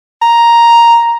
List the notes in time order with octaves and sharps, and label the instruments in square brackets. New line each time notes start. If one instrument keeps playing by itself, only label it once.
[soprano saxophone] A#5